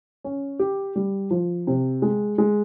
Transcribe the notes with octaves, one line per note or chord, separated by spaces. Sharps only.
C#4
G4
G3
F3
C3
G#3
G#3